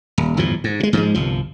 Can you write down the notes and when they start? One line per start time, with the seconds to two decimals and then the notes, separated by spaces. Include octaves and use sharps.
0.18 D#1
0.37 G1 E2 A2 F3
0.64 G#2
0.80 A#2 G#3
0.93 G#2 F3 G3 G#3
1.14 G1 C2 F3